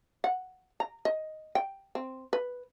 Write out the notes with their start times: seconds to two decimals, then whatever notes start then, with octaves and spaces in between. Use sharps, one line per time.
0.24 F#5
0.80 A#5
1.05 D#5
1.55 G5
1.95 C4
2.33 B4